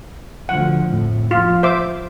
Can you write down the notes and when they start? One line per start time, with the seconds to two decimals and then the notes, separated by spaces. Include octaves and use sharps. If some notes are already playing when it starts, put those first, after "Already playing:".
0.49 D2 D3 F3 F#5
0.85 F2 A2
1.31 F3 F4
1.63 C5 E5 D6